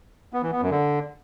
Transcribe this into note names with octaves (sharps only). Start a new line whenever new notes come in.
B3
E3
B3
F#2
D3